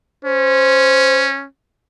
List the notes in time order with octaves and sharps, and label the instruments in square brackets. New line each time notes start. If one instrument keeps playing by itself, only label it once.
[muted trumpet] C#4 [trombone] C5